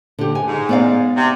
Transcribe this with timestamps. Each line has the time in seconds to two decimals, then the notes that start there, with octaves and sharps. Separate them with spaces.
0.19 D3 G4
0.35 G#5
0.48 G#2
0.69 B3 D5 F5
1.17 C3